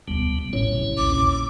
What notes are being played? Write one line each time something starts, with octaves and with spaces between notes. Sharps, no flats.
E1 D2 C3 G3 B3
A1 A2 C#4 E4 C#5
C3 C4
A#1 D#2 D6
E2